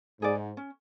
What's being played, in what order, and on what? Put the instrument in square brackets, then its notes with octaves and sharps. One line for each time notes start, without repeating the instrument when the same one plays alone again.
[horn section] G#2 [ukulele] G#4 D5
[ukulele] C#4